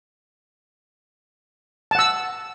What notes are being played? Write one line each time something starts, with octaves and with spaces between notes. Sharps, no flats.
F#5 A5 E6